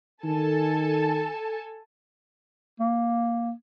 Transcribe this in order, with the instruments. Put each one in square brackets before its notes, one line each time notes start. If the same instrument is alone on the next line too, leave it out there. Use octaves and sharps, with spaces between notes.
[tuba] D#3 [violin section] A4 G#5 A5
[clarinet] A#3